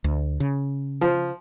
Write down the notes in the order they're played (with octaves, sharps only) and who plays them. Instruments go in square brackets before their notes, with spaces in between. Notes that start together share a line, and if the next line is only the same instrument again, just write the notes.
[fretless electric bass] D2
C#3
[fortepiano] F3